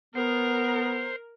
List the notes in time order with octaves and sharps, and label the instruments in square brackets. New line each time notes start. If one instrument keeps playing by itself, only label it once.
[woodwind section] B3 [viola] A#4 [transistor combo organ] C5